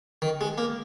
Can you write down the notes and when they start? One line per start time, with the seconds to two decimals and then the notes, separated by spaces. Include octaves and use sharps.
0.22 D#3
0.41 G#3
0.58 A#3